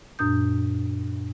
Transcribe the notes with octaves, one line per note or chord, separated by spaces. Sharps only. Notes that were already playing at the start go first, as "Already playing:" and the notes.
F#2 A#2 D4 D#6 G6